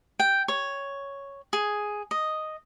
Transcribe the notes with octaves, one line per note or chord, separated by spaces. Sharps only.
G5
C#5
G#4
D#5